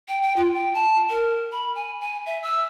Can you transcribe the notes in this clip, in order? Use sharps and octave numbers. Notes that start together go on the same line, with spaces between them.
G5
G5
F4
G5
A5
A#4
B5
G#5
G#5
E5
E6